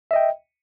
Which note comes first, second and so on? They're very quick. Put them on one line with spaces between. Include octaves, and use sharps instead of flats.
E5 D#5 G5